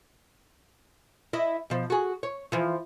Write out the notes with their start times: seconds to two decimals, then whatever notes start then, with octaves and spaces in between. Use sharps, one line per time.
1.33 E4 D#5
1.70 B2 F3
1.90 F#4 G#4
2.23 C#5
2.52 E3 F3